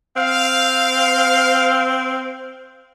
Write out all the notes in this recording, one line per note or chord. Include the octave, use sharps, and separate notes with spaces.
C4 F5